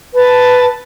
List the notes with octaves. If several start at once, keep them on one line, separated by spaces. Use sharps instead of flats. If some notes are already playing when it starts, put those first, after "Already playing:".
B4 A5